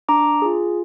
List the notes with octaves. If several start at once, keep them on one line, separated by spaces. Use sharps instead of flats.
D4 A#5 D6
F4 G#4